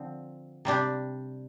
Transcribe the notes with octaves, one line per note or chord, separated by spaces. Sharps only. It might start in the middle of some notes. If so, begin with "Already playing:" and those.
Already playing: D3 F3 C4
C3 G3 D4 G4